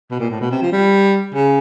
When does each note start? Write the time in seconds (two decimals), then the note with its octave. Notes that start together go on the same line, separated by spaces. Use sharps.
0.11 B2
0.20 A#2
0.31 A2
0.41 B2
0.51 C3
0.62 F3
0.72 G3
1.34 C#3